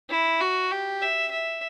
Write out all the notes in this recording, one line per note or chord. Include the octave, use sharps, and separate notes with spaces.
E4
F#4
G4
E5
E5